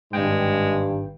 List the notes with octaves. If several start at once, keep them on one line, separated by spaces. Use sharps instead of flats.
G#1 G2 G#3 G5